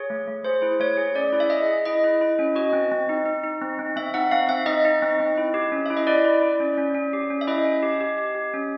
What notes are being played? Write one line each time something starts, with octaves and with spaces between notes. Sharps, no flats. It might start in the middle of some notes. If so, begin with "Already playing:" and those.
Already playing: G#4 C#5
A3
A3
G#4 C5
E4
A3 C#5
G#4
C#4 D5
E4
E5
G#4 D#5
G#4
E4 D#5
E4
E4
C#4
F#4 D#5
C4
C4
D#4
D#4
D#4
C4
C4
C4 E5
D#4 F#5
C4 F5
C4 E5
D#4 D#5
D#4
C4
C4
E4
G4
C#4
E4 E5
D#5
E4 D5
E4
E4
C#4
C#4
C#4
G4
C#4
E5
E4 D#5
C#4
G4
G4
G4
G4
C#4